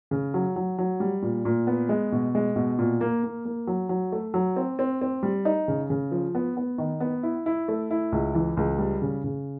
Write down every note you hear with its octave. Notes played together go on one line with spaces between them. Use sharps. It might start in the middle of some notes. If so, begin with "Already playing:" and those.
C#3
F#3
F#3
F#3
G3
A#2
A#2
B3
G#3
B2
G#3
B2
A#2
A#3
A#3
A#3
F#3
F#3
A3
F#3
C4
C4
C4
G3
D#4
C#3
C#3
F3
B3
B3
D#3
B3
E4
E4
A3
E4
C#2
E3
C#2
G3
C#3
C#3